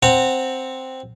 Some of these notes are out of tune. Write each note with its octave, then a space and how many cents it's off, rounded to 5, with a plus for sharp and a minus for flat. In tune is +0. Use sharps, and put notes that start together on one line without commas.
C4 +0 F#5 +0 A#5 -25